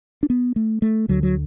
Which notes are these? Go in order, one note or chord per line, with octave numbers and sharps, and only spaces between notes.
D4
B3
A3
A3
D2 D3 F#3
F#3